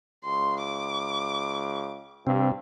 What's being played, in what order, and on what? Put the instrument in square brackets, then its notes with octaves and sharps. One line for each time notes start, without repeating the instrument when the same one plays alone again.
[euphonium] C#2 [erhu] C6
[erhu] D6
[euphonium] G2 [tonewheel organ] C3 C4